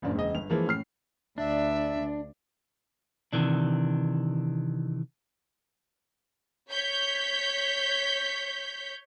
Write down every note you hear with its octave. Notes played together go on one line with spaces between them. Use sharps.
F#1 F#2 A#2 D4
E1 C#3 D#5
G1 F7
E3 F3 G#3 A#3
A2 C#4 F6 C7
D2 D4 D5 E5
C3 D#3 E3 D4
C#5 G6 B6